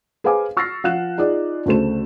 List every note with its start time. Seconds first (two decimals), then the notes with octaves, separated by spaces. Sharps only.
0.24 G#4 B4 C5 F5 G#5 D6
0.57 C#6 E6 F6 A6 A#6 C7
0.84 F3 F5 F#5 F#6 E7
1.18 D#4 F4 G#4 D5
1.66 D2 C#3 A3 C5 E7